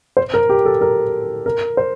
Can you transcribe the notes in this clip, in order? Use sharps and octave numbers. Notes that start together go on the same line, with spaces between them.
C5
A#4
G4
A4
A#4
A#4
C5